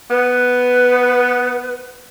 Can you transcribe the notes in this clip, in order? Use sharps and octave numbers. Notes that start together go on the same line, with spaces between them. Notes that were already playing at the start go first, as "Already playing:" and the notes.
B3 B4